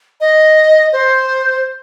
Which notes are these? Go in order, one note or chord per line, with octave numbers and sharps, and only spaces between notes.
D#5
C5